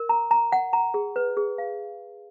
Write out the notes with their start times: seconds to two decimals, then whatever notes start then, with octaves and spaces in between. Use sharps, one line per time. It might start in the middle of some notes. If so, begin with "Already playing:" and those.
Already playing: A#4
0.09 A#5
0.31 A#5
0.52 F#5
0.73 A#5
0.94 G#4
1.16 B4
1.37 G#4
1.58 F5